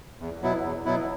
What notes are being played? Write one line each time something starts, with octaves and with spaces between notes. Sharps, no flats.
E2
B2 F#3 B3 E4
E2
B2 F#3 B3 E4